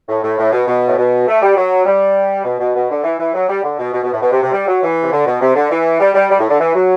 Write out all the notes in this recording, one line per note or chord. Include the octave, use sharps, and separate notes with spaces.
A2
A2
A2
B2
B2
A2
B2
A3
G3
F#3
G3
B2
B2
B2
D3
E3
E3
F#3
G3
D3
B2
B2
B2
A2
B2
C3
C3
G3
F#3
E3
C3
D3
B2
C3
D3
E3
G3
G3
G3
A2
D3
E3
F#3